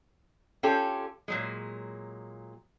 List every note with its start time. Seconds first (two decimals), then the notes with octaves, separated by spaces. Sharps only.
0.63 C#4 F4 G4 A4
1.28 A#2 F#3 G#3